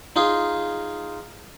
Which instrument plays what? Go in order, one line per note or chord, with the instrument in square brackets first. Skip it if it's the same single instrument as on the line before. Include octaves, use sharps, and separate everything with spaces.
[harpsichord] D#4 F4 G#4